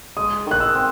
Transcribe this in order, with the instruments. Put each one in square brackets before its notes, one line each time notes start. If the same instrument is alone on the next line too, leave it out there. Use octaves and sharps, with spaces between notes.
[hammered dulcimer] G#3 [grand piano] D#6
[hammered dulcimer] D#3 [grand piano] F#6
[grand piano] E6
[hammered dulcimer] C4